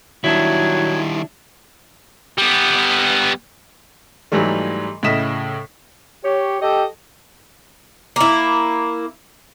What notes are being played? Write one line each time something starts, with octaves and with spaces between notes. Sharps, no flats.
D#3 F#3 G3 D4 E4 G#6
G3 B3
G#2 E3 F#3 G3 A3
A2 C#3 E4 D#5 B6 E7
G4 C#5
G4 A4 D#5 G5
A#3 E4